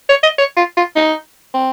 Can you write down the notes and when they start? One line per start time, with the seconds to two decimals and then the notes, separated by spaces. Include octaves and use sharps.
0.09 C#5
0.23 D#5
0.38 C#5
0.57 F4
0.77 F4
0.96 D#4
1.54 C4